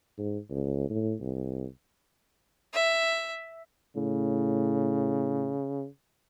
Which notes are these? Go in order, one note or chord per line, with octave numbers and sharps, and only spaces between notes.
G#2
C#2
A2
C2
E5
A2 C#3